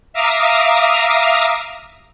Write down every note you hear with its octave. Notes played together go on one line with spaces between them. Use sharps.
E5 F5 A#5 D6 D#6